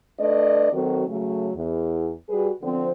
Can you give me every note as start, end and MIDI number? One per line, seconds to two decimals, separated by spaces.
0.19 0.69 57
0.19 0.69 62
0.19 0.69 71
0.19 0.69 74
0.19 0.69 75
0.72 1.05 51
0.72 1.05 54
0.72 1.05 60
0.72 1.05 66
0.72 1.05 69
1.07 1.49 49
1.07 1.49 54
1.07 1.49 57
1.55 2.11 40
2.29 2.50 55
2.29 2.50 66
2.29 2.50 68
2.29 2.50 71
2.62 2.90 50
2.62 2.90 53
2.62 2.90 60